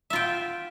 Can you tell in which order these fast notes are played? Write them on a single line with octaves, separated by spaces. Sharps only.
E5 F4 G5